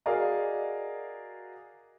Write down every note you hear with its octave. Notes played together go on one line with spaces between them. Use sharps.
F#4 G#4 A#4 D5 D#5 F5